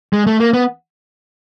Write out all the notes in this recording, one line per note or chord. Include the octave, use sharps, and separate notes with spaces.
G#3
A3
A#3
B3